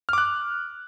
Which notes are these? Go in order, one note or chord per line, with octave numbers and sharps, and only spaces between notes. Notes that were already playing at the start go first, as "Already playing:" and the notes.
D6 F6 F#6